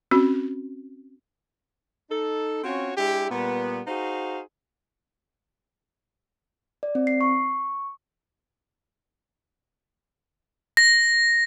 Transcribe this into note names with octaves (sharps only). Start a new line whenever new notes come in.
C4 C#4 F#4
D#4 A4
C4 C#4 F4 F#4 C#5
G#3 D4 E4 G4
A#2 G3 B3
D#4 F#4 G#4 C5 F5
D5
C4
C7
C#6
A#6